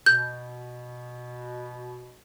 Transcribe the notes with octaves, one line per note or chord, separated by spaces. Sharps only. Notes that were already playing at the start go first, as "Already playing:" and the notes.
B2 G6